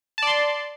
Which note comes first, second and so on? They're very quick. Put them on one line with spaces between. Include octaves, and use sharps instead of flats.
A5 D5 C6